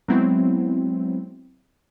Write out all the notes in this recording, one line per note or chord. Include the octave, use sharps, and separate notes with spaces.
F#3 G#3 B3 C4 E4